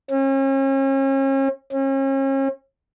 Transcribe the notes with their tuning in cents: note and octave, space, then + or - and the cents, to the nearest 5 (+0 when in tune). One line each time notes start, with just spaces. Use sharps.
C#4 -40
C#4 -40